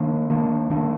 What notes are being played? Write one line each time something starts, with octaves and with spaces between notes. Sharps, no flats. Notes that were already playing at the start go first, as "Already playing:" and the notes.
Already playing: D#3 A#3 D4
D#3 A#3 D4
D#3 A#3 D4